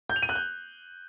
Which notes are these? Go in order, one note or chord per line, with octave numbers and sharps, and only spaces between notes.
G6
F7
D#7
F#6
G6